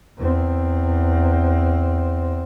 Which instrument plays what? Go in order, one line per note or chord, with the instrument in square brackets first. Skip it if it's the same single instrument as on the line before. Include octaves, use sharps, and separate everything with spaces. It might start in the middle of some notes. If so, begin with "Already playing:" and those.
[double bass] E2 C4